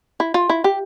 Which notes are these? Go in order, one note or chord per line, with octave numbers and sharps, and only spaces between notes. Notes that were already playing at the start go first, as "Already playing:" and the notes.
E4
F4
E4
G4